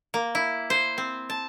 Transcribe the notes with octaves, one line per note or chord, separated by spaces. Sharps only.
A#3
E4
C5
C4
A5